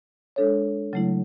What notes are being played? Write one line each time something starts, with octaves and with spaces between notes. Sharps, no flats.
G#3 D4 A4 C#5
C#3 F#3 A3 E4